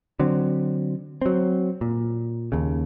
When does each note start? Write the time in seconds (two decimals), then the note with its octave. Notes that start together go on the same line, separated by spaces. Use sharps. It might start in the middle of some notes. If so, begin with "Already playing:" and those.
0.19 D3 F#3 C4
1.22 F#3 C4
1.81 A#2
2.52 D#2 C#3